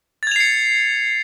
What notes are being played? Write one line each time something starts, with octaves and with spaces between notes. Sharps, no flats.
G#6 A6 C7 C#7 F7